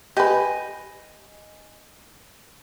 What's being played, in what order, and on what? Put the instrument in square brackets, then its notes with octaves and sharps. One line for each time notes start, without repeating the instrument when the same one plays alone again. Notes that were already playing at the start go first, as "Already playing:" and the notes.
[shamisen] G4 B4 [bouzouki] D#5 G#5